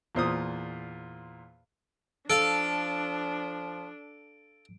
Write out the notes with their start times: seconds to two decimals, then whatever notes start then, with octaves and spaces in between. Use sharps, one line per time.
0.15 E2 A#2 C5 D#6
2.30 F3 D4 A4 F5 D7